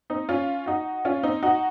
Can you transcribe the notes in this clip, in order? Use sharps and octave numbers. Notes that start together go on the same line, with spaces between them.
C4 D#4
C#4 F4
D#4 F#4
C#4 F4
C4 D#4
D#4 F#4